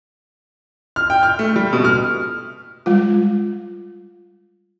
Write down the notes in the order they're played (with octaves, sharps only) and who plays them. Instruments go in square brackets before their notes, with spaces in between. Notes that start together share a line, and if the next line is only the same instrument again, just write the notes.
[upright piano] F6
G5
F6
A3
G3
B2
F6
[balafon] G3 G#3 F4